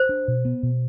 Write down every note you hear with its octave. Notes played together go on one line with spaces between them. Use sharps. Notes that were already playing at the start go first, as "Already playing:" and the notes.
Already playing: C5
D4
B2
B3
B2